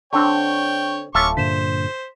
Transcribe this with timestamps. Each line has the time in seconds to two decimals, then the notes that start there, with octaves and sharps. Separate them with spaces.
0.13 D3 C4 D4 C#5 G5 C#6
1.15 D1 C#4 F4 A4 E5 C#6 D6
1.37 G2 A#2 D3 C5 B6 E7